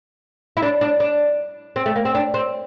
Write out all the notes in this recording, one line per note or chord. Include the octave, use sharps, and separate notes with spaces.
E4
D4
D4
D4
C4
A3
A#3
C4
D4
C4